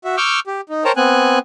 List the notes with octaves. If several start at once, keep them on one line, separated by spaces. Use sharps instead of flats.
F#4 E5
C#6 D6 E6 F6 G6
G4
D#4
A#4 C5 C#5 G5 A5 A#5
B3 C4 G#5 F#6